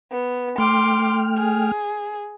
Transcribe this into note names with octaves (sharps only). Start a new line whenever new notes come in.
B3
A3 G5 C6 D6 F6
G#4